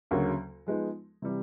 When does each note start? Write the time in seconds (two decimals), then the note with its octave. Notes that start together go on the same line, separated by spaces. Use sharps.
0.11 D2 C#3 F#3 A#3
0.67 F3 G#3 B3 D#4
1.22 C3 E3 G3